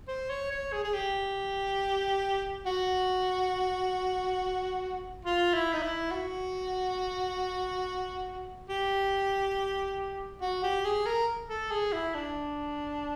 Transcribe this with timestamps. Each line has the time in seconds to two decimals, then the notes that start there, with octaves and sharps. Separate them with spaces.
0.08 C5
0.30 C#5
0.51 C#5
0.73 G#4
0.84 G#4
0.94 G4
2.66 F#4
5.25 F4
5.54 E4
5.73 D#4
5.82 E4
6.11 F#4
8.69 G4
10.41 F#4
10.63 G4
10.85 G#4
11.06 A#4
11.49 A4
11.71 G#4
11.93 E4
12.14 D4